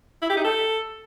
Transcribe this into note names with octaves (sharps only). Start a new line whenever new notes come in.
E4
G4
D#4
A4